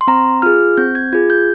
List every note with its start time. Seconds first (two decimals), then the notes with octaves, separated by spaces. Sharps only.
0.01 C6
0.07 C4 A#5
0.42 F4 G#4 F6
0.77 C4 G6
0.95 G#6
1.13 F4 G#4 G#6
1.30 G6